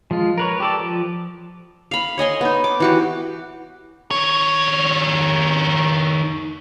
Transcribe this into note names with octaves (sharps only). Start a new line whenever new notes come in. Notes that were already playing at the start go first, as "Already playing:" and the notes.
F3 G#3 F4
A#4 B4 C#5
G4 A4 D5
F3
F5 B5
C#5 D#5 G#5 C6
B3 D#4
D6
E3 F#4 G4
D#3 C#5